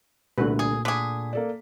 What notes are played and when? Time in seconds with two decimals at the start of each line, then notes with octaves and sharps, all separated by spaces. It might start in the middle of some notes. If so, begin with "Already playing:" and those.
0.38 C2 A#2 D3 A3 F#4 B4
0.59 G#4
0.85 D3 G#4 B6
1.33 A#3 A4 D5